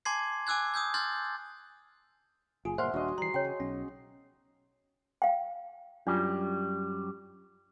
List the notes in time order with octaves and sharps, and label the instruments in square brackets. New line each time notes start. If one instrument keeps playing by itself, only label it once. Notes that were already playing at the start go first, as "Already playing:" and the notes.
[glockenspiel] G#5 A5 C6 D6 G#6 C7
G#5 D6 E6 F#6 G#6
D#6 E6 G6 G#6
C6 F6 G6 A6
[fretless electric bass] F#1 [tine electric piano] F4 [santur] G#4
[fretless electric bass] G1 A#2 [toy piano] C5 [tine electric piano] E5 F#5 F6 [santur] C6
[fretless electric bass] D#1 D4 [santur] F#4 D#5
[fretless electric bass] E3 G3 [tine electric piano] A#5 C7 [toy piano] C6
[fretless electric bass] C#3 [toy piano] C#5 G5
[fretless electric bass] B1 [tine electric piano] C#4
[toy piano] F5 G5
[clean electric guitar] F#2 G3 [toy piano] D4 F4